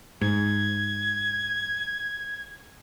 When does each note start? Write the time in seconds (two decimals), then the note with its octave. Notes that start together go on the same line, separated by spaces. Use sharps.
0.21 G#2 G#6